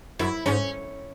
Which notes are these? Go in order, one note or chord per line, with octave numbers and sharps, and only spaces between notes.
F#2 E4
G#2 C#4